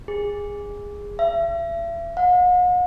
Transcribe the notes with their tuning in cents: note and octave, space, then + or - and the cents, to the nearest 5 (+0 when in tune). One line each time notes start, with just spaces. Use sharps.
G#4 -20
E5 +40
F#5 -45